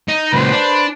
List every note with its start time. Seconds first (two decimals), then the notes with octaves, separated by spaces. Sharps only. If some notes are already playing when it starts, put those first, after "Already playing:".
0.09 D#4
0.33 C#2 A#2 B4 C5 B5
0.52 D4